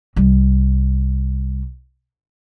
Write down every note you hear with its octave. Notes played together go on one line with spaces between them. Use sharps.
C2 G3